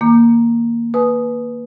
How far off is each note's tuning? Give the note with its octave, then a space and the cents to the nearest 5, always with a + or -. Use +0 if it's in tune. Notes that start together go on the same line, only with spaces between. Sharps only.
D#3 +0 A#3 +0 D6 +25
B4 -10 G#5 +30 D#6 +0